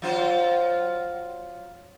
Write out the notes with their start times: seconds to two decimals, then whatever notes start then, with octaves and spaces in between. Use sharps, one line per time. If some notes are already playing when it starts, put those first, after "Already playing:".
0.02 F#3 F4 C5